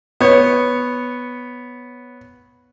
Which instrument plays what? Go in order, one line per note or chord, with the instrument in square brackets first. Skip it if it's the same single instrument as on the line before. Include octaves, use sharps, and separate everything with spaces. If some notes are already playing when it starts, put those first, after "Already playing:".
[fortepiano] B3 C#5